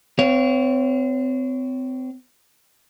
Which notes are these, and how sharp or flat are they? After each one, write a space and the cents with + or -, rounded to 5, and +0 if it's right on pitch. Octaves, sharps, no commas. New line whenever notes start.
C4 -30 C#5 +15 F5 +0